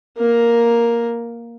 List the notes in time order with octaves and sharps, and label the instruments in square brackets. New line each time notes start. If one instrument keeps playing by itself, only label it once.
[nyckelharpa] A#3 A#4